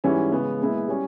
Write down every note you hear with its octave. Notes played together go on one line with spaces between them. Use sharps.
G#2 E3 G3 C#4 E4
C#3 G#3 B3
A#2 G#3 B3 E4
G3 C#4